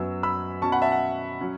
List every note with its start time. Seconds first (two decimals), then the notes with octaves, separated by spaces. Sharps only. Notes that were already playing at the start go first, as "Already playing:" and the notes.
Already playing: F#2 F#3 B3 E6
0.23 B5 E6
0.62 B2 F#3 C#4 A5 C#6
0.72 F#5 B5
0.82 E5 A5
0.92 F#5
1.41 F#3 C#4